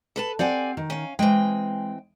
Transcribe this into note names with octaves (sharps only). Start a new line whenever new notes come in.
A4 B4 A5
C4 G4 D5 F#5 G#5
D#3
C#4 F5
E3 G#3 C4 G5